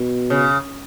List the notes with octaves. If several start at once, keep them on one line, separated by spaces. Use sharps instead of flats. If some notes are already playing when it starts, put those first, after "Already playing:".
Already playing: B2
C#3